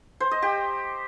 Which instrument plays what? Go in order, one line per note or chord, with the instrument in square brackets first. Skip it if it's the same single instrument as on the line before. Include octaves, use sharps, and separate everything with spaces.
[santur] C5
D#5
G4